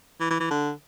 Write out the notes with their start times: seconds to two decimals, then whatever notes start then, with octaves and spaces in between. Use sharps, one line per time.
0.20 E3
0.30 E3
0.40 E3
0.50 D3